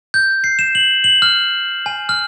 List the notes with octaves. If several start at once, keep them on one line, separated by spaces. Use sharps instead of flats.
G6
C7
E7
F#7
F#7
F6
G#5
F6